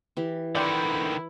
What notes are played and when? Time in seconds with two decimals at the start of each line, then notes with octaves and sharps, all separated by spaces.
0.17 E3 G4
0.55 D3 D#3 E4 D5 G5 C6